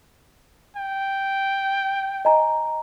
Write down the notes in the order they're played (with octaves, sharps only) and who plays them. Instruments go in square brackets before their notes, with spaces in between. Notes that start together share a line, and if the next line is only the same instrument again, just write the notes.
[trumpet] G5
[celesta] D#5 G#5 A#5